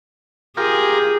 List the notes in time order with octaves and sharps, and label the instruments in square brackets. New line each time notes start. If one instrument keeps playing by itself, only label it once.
[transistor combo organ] F4 G4 A#4 [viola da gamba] G#4